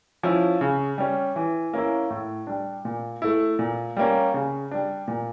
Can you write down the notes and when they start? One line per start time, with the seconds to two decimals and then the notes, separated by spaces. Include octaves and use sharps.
0.23 F3 C#4 E4
0.61 C#3
0.98 G3 C#4
1.36 E3
1.73 A#3 C#4 E4
2.10 A2
2.47 G3 D4
2.85 A#2
3.22 A3 E4
3.59 A#2
3.97 G3 A#3 C#4
4.34 C#3
4.71 G3 D4
5.08 A#2